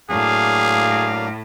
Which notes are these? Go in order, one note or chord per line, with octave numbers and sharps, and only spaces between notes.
A2 F#3 A#3 D4 G#4 F5